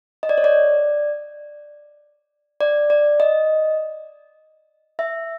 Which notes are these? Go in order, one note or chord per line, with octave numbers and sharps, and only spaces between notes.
D#5
D5
C#5
D5
D5
D5
D#5
E5